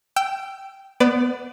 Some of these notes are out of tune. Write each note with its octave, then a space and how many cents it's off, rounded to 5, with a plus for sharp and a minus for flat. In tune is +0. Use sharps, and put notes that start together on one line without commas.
G5 -10 E6 +25
B3 +0 B4 +40 D5 +0